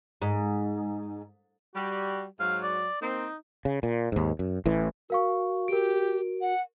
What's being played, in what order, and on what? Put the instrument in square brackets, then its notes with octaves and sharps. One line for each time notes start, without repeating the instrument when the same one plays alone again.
[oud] G#2
[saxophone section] G3 [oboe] F#4
[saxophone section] G#2 F#3 [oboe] F5
[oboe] D5
[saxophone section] A#3 C4 [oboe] D#4
[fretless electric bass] C#3
A#2
D#2 G#2
F#2
A1 A2 E3
[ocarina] F#4 [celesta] A#4 F5 C#6
[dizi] G4 [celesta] A#4 D7
[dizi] F#5